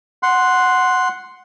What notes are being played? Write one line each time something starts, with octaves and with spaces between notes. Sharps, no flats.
F#5 C6